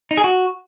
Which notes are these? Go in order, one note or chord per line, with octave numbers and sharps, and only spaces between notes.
D#4
G#4
F#4